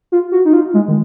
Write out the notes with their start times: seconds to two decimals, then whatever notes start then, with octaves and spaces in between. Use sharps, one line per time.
0.12 F4
0.32 F#4
0.45 D#4
0.53 F4
0.74 G#3
0.88 D#3